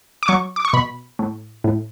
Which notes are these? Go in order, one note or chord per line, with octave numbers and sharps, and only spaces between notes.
D6
F#3 C#6
D6
C#6
B2 B5
A2
A2